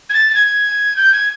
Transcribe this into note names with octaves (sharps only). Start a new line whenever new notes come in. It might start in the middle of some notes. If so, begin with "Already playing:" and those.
G#6
A6
A6
G#6
G6
G#6